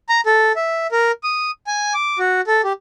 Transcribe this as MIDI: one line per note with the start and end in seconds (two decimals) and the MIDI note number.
0.09 0.21 82
0.26 0.52 69
0.56 0.87 76
0.92 1.12 70
1.24 1.51 87
1.67 1.94 80
1.94 2.19 86
2.19 2.41 66
2.47 2.62 69
2.64 2.73 67